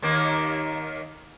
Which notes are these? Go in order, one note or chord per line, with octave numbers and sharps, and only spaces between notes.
D#2 D#3 A#3